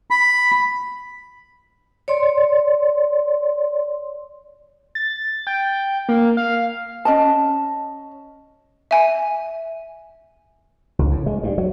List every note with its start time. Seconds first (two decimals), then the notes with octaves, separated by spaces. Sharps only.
0.10 B5
2.08 C#5 D5 C6
4.95 A6
5.47 G5
6.09 A#3
6.37 F5
7.05 C#4 D#5 A5
8.91 E5 G#5
10.99 C#2
11.12 A2
11.26 G#3
11.43 G2
11.58 F#3